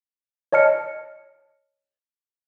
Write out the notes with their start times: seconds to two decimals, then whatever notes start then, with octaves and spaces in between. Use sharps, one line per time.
0.53 C#5 D#5 A5 F6 C#7